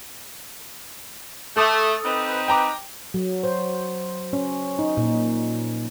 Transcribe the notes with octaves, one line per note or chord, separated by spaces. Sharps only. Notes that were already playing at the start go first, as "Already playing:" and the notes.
A3 A4 D6 D#6
C4 D#4 B4
G5 A#5 D6
F#3
C5
C#4
D#4
A#2